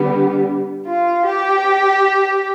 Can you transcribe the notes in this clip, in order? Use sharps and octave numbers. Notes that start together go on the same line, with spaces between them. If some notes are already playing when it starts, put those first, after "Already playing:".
Already playing: D3 G3 B3
F4
G4